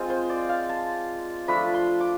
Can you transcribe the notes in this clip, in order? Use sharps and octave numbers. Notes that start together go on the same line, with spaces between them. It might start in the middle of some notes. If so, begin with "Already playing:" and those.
Already playing: G#3 C4 F4
C5
D5
F5
A5
F3 A3 D4 B5
C6
D6